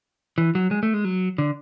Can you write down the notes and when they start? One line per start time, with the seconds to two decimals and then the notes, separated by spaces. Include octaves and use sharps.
0.38 E3
0.55 F#3
0.71 G#3
0.83 A3
0.94 G#3
1.05 F#3
1.38 D3